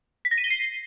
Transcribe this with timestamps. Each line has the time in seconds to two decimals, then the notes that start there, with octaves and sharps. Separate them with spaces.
0.25 B6
0.31 A#6
0.38 D#7
0.44 G7
0.50 C7